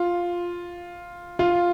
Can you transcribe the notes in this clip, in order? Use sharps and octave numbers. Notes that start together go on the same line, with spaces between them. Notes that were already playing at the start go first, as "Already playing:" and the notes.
Already playing: F4
F4